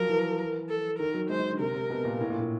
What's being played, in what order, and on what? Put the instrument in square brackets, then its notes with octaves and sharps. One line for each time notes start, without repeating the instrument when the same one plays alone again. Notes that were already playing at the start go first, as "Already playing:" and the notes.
Already playing: [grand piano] F3 F#3 [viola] A#4
[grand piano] E3
[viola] A4
[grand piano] D#3 [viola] A#4
[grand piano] F#3
[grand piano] G#3 [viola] C5
[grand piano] G#3
D3
[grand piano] C3 [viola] A#4
[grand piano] C3
B2
A#2
A2
A#2
A#2